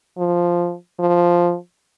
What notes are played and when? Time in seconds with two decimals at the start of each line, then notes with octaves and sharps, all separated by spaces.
0.18 F3
0.99 F3